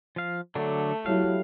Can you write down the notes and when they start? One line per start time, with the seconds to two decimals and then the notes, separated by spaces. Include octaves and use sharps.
0.16 F3 F5
0.55 D3 F#3 A3 D4
1.06 F#3 E4 G4 A4 F5